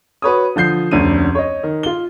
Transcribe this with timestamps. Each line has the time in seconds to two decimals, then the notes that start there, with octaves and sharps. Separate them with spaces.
0.22 F#4 B4 C#5 D#6
0.56 D3 F3 G6 C7
0.91 F1 D2 C#4 D4 D#7
1.35 C#5 D#5
1.63 D#3
1.83 F4 G7